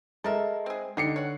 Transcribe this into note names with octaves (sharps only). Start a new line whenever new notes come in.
G#3 A4 A#4 E5
C4 G#4
D3 D#4 G4 C7 C#7
C#5 F#5